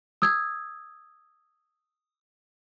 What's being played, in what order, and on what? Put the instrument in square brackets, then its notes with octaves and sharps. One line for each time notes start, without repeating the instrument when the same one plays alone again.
[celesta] D#6 E6 G#6